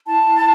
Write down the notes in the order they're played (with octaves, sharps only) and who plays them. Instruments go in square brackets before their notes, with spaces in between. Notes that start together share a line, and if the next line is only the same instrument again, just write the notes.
[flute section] E4 A5